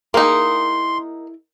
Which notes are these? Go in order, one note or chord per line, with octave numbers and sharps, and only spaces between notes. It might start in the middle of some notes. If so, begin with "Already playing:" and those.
A#3 D#4 E4 G#4 A#4 C6